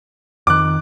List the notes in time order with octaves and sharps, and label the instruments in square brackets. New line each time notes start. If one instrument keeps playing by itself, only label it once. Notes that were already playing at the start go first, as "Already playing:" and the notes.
[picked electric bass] F2 D#3 [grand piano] D6 F#6